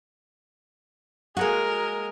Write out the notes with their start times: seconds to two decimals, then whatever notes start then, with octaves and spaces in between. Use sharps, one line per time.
1.37 G#3 A#3 F#4 G#4 A#4